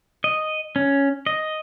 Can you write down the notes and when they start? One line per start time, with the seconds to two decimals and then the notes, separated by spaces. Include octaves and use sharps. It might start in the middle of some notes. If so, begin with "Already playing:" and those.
0.24 D#5
0.76 C#4
1.26 D#5